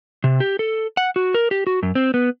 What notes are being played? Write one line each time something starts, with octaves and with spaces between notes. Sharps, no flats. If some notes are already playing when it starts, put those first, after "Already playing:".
C3
G4
A4
F#5
F#4
A#4
G4
F#4
F#2
C4
B3